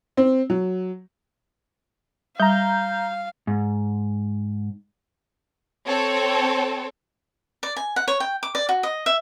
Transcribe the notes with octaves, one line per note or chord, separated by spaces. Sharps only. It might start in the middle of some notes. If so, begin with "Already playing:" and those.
C4
F#3
G3 F5 A#5 G6
G#2
C4 A4 C#5
D5
G#5
F#5
C#5
G5
D6
D5
F#4
D#5
E5